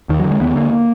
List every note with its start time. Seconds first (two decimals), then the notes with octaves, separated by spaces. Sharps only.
0.09 D#2 D#3
0.19 F#3
0.24 D3
0.31 G#3
0.41 D#2 B3
0.56 D3 A#3